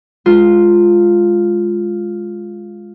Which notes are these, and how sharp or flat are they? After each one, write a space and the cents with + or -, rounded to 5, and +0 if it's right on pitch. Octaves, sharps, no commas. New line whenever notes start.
G#3 +0 F4 +0